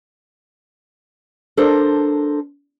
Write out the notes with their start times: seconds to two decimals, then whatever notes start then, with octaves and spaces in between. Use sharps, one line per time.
1.57 D4 A4 A#4 C5